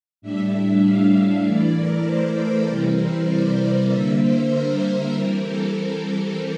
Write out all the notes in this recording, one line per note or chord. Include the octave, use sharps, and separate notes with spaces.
A2 G3 D4 E5
E5
F5
F5
E3 A3 E4 D5
A#4
C5
A4
C3 E3 G3 C4 E4 A#4
C5
D5
D3 G3 A#3 E5
C5
A#4
E3 G3 C4
A4
A#4
A4